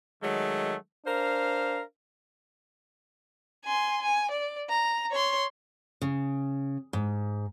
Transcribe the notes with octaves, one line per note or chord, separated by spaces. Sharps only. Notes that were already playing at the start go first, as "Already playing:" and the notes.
D#3 F#3 G#3 A3
D4 A#4 C5 F5
G#5 C6
G#5
D5
A#5
C#5 C6
C#3
G#2